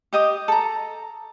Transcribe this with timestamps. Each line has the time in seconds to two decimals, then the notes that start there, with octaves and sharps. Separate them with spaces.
0.13 G4 D#5 D#6
0.48 A4 A#5